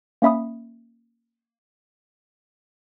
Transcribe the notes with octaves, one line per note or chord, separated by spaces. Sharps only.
A#3 C#4 E5 B5 D#6